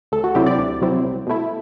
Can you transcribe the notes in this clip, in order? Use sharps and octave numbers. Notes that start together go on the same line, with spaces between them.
D2 A4
F#4
C3 F#3 C4 E4 G4
D5
D2
C3 F#3 C4 E4
C2
B2 A3 E4